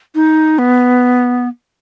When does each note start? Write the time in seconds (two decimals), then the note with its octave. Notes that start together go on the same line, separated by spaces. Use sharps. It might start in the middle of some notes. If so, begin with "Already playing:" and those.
0.15 D#4
0.58 B3